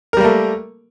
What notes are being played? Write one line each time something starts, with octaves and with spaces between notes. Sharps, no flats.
G3 A3 A#3 A#4